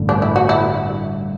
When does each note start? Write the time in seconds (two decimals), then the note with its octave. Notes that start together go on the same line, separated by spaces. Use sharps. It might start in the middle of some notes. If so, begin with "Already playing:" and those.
Already playing: A1 G2 D3 A3
0.09 D4
0.22 E4
0.36 F#4
0.49 E4